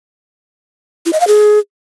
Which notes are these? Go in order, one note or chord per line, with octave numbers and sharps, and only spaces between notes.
E4
D#5
F5
G#4